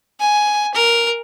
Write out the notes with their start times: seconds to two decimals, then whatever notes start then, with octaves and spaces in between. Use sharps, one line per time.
0.21 G#5
0.75 A#4